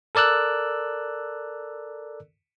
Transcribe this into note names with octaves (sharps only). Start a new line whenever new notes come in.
A4 A#4 D5 E6 F#6